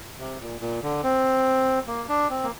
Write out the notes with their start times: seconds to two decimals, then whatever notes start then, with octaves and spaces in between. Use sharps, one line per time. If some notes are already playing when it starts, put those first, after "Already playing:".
0.19 C3
0.40 A#2
0.61 A#2
0.83 D3
1.04 C4
1.87 A#3
2.09 D4
2.30 C4
2.43 A#3